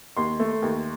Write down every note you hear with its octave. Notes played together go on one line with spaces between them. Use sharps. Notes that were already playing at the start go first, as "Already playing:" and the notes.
D#2 C6
A3
D#2